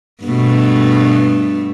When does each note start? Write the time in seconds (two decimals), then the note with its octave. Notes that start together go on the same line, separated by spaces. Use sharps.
0.24 G2 B2 A3